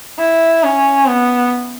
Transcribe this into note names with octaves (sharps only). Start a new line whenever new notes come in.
E4
C#4
B3